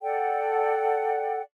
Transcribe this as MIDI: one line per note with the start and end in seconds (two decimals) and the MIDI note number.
0.02 1.41 69
0.02 1.41 74
0.02 1.41 78
0.02 1.41 79